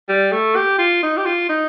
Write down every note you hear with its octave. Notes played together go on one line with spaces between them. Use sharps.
G3
A3
G4
F4
D#4
G4
F4
D#4